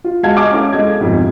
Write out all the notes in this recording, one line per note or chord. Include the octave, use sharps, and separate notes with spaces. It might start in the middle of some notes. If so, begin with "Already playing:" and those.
F4
G#3 F#4 F5 A5 G#6
D#5 F5 G#5 D6
C#4 E4 A4
G#3 D#5 G#6
B1 F2 G#2 C3